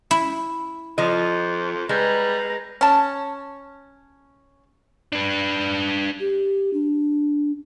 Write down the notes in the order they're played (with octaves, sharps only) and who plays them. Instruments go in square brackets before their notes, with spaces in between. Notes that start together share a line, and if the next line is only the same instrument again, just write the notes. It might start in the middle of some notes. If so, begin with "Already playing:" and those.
[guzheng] E4
[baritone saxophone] F2 [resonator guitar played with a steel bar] F3 D#5
[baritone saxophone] G3 [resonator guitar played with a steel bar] G#3 [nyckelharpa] B4 A#5
[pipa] C#4 A5
[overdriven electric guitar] D4 B4
[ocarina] G4
D4